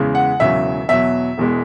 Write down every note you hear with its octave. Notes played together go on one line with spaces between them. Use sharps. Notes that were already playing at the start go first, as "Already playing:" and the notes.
Already playing: E2 C#3 G#3
F#5
E1 E2 C#3 F#3 E5
E2 B2 F#3 E5
E1 E2 B2 G#3